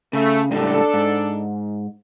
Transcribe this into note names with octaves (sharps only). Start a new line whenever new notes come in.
C#3 A3
C#2 A2 G3 D4 A4
G#2